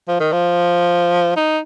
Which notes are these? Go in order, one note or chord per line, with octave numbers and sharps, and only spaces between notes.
F3
D#3
F3
D#4